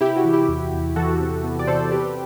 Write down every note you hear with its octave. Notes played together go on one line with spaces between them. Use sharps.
C3 E4 G4
F#4
E3
E4 G4
E2
E2
E3 F#4 A4
C3
B3
D5
C3 A4 C5
C4 G4 B4